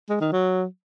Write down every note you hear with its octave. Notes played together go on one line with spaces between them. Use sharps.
G#3
D#3
F#3